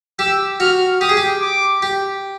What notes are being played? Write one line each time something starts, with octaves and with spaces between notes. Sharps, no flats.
G4 E6
F#4 F6
G4 D#6
G#4
G4
D6
G4